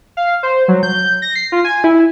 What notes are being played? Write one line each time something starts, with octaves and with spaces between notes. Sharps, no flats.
F5
C5
F#3
G6
A#6
C7
F4
G#5
E4